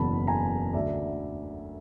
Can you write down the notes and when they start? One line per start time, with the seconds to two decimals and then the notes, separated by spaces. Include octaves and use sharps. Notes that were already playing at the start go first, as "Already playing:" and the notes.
Already playing: F#1 E2 B2 A5 B5
0.27 G#5 A#5
0.73 D2 D3 D5 E5